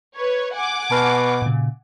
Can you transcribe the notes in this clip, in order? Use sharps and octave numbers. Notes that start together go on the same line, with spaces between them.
B4 C#5
F#5 G#5 D6
B2 A5 F6
A#2 C#3